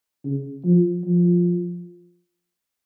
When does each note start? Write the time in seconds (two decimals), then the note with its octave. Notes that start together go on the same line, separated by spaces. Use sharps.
0.24 C#3
0.64 F3
1.05 F3